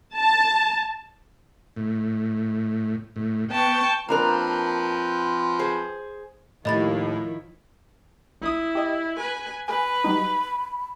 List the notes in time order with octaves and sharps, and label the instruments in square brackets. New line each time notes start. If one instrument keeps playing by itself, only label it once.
[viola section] A5
[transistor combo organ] A2
A2
[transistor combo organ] B3 [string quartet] G5 A5 C#6
[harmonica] F3 C4 B4 [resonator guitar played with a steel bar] A#3 D4 A#4
[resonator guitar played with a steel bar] G#4 C5
[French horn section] D#2 [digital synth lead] A2 [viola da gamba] D#3 F3 E4 [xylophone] D#5 B5 A6
[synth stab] A#1 D#6 [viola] E4
[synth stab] G4 D#5
[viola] B4 G#5
[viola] B4 [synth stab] G#5 [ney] B5
[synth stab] F#3 G3 D#4